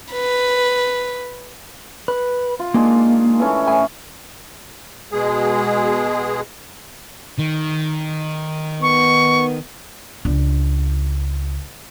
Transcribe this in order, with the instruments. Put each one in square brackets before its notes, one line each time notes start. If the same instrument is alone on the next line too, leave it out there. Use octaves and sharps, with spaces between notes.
[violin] B4
[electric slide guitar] B4
[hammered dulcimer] F4
[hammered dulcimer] D#3 G#3 D4 [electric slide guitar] A#3
[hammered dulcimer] E3 A3 C#4
[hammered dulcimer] A2 C#5 [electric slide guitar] G#5
[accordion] B2 G#3 G#4
[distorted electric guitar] D#3
[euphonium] B3 [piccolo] C#6
[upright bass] C#2 D4